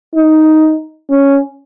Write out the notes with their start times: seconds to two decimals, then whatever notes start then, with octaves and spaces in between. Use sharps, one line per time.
0.14 D#4
1.10 C#4